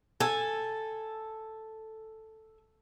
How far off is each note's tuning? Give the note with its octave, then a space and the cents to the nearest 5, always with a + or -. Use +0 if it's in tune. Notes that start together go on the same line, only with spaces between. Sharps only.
A4 +0 G#5 -5